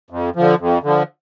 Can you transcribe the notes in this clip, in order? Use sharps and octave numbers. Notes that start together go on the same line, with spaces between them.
F2
D3 F3
F2
D3 F3